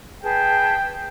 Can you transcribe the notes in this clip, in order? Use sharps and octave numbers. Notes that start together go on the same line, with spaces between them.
G#4 B4 G5 A5